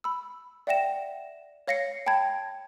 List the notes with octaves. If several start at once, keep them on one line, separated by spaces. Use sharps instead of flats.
B5 E6
D5 E5 F#5 G5 A#6 E7
C#5 F5 A#6 C7 C#7
G5 A5 B5 G#6